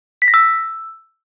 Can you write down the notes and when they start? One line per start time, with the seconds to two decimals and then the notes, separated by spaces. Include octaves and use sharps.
0.22 B6
0.28 A#6
0.34 E6